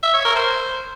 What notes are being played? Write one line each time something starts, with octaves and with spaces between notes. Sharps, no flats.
E5
C#5
A#4
C5